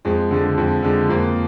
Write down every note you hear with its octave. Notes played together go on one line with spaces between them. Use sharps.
F2 G#3
D3 G#3
F2
D3 G#3
F2 A#3